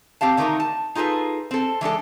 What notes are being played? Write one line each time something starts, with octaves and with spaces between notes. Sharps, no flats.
C4 G4 F5 A5
D3 D#3 A3 A#3 D#4 A#4
A5
D#4 F4 G#4 A4 B4
C4 A4
E3 G#3 D4 A4